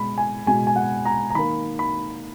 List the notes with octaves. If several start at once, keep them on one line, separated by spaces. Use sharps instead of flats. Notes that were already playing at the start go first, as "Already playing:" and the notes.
Already playing: B2 G#3 B5
G#5
B2 G#3 G#5
G#5
F#5
A#5
A#5
D#3 A#3 B5
B5